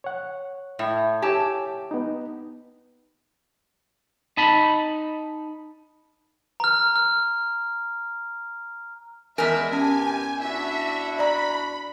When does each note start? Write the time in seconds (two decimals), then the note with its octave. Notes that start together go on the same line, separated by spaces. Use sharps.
0.04 C#5 F#5
0.79 A2
1.22 G4 C#5 E5 G#5 A5
1.91 B3 D#4
4.37 D#4 A5 B5
6.60 A#5 F6
6.96 F6
9.38 E2 G#3 A#4 D5 E5 G#5
9.72 C2 G2 C#4 G4 G#5 A5
10.42 D4 E4 F#4 E5
11.19 D5 A#5 B5